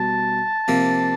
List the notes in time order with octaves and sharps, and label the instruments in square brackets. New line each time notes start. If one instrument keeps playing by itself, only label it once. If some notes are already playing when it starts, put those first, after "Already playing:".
Already playing: [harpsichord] B2 G3 [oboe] A5
[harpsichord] C3 F3 A#3